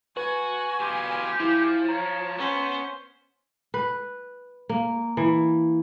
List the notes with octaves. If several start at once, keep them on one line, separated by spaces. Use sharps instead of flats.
F#4 B4 G#5
B2 F4 G4
F3 E4
C#5 A#5
B3 C#4 C5
B4
A#3
E3